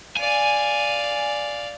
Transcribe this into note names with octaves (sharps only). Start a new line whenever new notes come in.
D5 F5 G#5